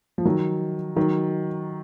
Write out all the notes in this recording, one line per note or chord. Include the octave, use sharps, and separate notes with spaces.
F3
D#3 F#3
D#3 F#3